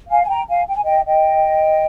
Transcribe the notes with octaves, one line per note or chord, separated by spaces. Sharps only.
F5 G#5
G#5
G5 A#5
F5 G#5
G5
G#5
D#5 G5
D#5 G5